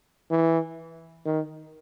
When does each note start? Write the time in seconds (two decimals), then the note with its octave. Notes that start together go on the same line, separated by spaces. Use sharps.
0.30 E3
1.25 D#3